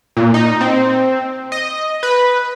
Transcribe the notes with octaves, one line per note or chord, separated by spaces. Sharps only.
A#2
D#4
C4
D#5
B4